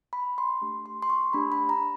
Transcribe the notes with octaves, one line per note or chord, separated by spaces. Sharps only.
B5
C6
A3 D4 G4
C6
C6
C#6
A3 D4 G4 B5
B5
A#5